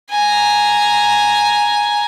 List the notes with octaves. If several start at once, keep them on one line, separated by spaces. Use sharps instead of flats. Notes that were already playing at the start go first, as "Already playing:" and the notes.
G#5 A#5